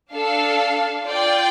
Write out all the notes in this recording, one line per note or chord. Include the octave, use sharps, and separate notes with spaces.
D4 A4 F5
F4 D5 G5